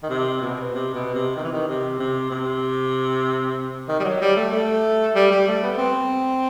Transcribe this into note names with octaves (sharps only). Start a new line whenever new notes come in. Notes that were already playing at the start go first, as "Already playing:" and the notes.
D#3
C3
B2
C3
B2
C3
D#3
E3
D#3
C3
C3
C3
D#3
G3
F#3
G3
A3
A3
G3
G3
A3
B3
C4